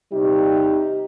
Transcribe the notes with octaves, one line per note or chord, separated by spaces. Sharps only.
C3 G3 D#4 G4